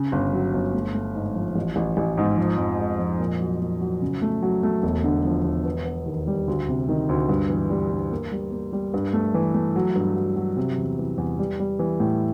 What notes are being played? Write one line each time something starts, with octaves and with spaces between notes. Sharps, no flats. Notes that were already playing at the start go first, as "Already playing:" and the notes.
Already playing: C#3
G1
F#3
G1
A3
A3
G#2
F3
A1
A1
A1
G#2
F3
F2
G#3
F2
A#2
F#3
A#2
F#3
C#3
A3
F#3
A3
E1
D3
F3
E1
B3
B3
D#2
G3
D2
C3
D#3
D2
G2
E3
G3
G2
A#3
G3
A#3
G3
G2
A3
E3
A3
F#3
G2
F#3
F#3
C3
E2
E3
E2
G3
G3
E3
A2